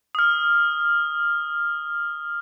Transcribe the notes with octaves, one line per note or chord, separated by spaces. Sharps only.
D#6 F6